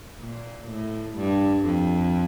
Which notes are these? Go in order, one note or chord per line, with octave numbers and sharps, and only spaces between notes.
A#2
A2
G2
F2